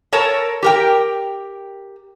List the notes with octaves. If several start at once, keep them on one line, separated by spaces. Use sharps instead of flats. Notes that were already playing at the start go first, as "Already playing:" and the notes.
A4 A#4 C#5 A5
G4 A#4 G5